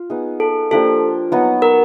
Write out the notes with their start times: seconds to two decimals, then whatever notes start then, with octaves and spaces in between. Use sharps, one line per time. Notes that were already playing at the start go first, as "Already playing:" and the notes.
Already playing: F4
0.10 B3 D#4 G#4
0.40 A4
0.71 F3 A#3 D4 G4 A4
1.32 F#3 B3 D#4 F#4
1.62 A#4